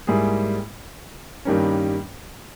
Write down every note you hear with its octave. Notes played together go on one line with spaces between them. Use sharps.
G#2 G3 A#3 E4 G#4
G2 D#3 G3 A#3 C#4